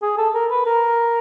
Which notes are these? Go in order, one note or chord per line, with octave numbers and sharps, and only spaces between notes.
G#4
A4
A#4
B4
A#4